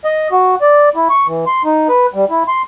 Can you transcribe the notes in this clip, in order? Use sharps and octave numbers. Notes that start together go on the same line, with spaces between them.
D#5
F#4
D5
E4
C#6
E3
C6
D#4
B4
G3
E4
C6